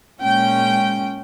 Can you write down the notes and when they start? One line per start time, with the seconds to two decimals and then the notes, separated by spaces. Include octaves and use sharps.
0.21 A#2 G#3 C#4 G5